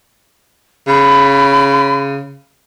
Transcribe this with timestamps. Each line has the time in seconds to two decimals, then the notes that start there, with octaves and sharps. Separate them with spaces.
0.87 C#3 B5